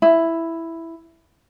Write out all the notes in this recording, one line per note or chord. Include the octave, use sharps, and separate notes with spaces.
E4